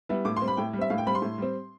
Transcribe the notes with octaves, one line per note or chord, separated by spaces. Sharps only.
G3 B3 E4
A2 D6
C6
G3 C4
B5
A2 G5
G3
C4 E5
A2 F5
G5
G3 C4 B5
C6
A2
G3 C4